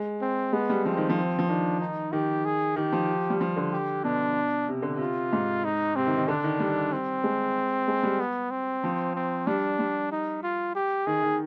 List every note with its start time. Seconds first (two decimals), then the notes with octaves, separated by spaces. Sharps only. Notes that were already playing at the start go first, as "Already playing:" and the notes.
Already playing: G#3
0.21 C4
0.53 G#3 B3
0.70 G3
0.85 F3 C4
0.97 D#3
1.10 F3
1.17 C4
1.39 F3
1.49 D#3 D4
1.80 D#4
2.12 D#3 G4
2.45 G#4
2.76 D#3 G4
2.93 F3
3.30 G3
3.41 F3
3.57 D3
3.72 G4
4.04 B2 D4
4.68 C3
4.82 D3
4.96 C3 F4
5.33 G#2
5.64 D#4
5.96 C3 C4
6.07 D#3
6.17 D#3
6.28 D3 D4
6.44 D#3
6.60 G3
6.92 C4
7.24 G#3
7.88 G#3
8.03 G3
8.20 B3
8.51 C4
8.84 F3
9.15 C4
9.47 G3 D4
9.79 G3
10.12 D#4
10.43 F4
10.75 G4
11.06 D#3 G#4
11.23 D#3